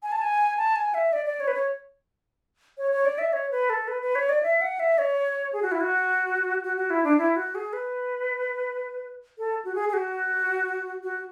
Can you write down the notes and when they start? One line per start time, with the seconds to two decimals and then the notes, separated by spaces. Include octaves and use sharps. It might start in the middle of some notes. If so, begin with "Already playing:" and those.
0.03 G#5
0.12 A5
0.22 G#5
0.58 A5
0.76 G#5
0.94 E5
1.13 D5
1.26 D5
1.40 C#5
1.48 B4
1.54 C#5
2.78 C#5
2.92 C#5
3.05 D5
3.18 E5
3.33 C#5
3.51 B4
3.70 A4
3.88 B4
4.02 B4
4.15 C#5
4.29 D5
4.43 E5
4.61 F#5
4.80 E5
4.98 C#5
5.53 G#4
5.62 F#4
5.72 E4
5.81 F#4
6.63 F#4
6.77 F#4
6.90 E4
7.04 D4
7.18 E4
7.36 F#4
7.55 G#4
7.73 B4
9.38 A4
9.65 F#4
9.75 G#4
9.89 G#4
9.93 F#4
11.03 F#4